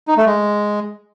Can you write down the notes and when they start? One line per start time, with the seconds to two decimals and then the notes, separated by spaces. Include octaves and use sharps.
0.08 D#4
0.17 A3
0.26 G#3